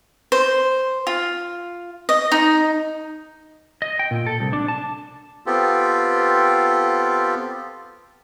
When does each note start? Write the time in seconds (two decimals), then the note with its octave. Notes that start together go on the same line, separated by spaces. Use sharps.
0.32 C5
1.07 F4
2.09 D#5
2.32 D#4
3.82 D#5
3.99 G5
4.11 A#2
4.26 A4
4.40 C2
4.53 D4
4.68 A5
5.46 B3 C4 F4 G4 A4